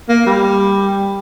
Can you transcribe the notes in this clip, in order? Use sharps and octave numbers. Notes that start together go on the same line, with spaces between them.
A#3
G3